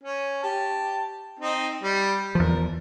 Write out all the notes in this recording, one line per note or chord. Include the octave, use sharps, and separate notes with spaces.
C#4
G4 A5
C4 D#4
G3
E2 F3 A#4